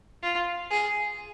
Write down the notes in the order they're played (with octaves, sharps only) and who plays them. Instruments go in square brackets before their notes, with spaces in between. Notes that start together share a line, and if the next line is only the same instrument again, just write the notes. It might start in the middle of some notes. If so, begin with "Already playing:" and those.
[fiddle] F4
G#4